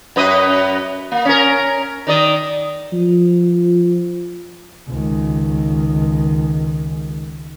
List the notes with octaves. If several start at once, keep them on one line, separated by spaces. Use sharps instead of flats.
F#2 B4 D#5
A#3
C#4 A#4
D#3 D5 D#5
F3
C#2 D#3